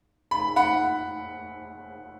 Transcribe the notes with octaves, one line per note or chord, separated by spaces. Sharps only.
B5
F#5 B5